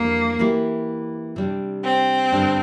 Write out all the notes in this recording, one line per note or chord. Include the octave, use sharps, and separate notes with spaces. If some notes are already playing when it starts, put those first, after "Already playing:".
Already playing: F2 E3 G3 A#3 D4
E3 A#3 E4 G4
C3 G3 D4
C4
G2 D3 G3 D4